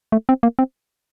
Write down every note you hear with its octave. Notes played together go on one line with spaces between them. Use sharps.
A3
C4
A#3
C4